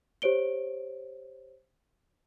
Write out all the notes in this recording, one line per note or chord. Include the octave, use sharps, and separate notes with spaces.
G4 C5 C#5 D7 G7